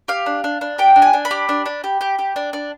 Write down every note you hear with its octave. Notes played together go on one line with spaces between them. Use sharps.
G4 F5
D4
D4
D4
G4 G5
D4
G#5
D4
B5
G4
D4
D4
G4
G4
G4
D4
D4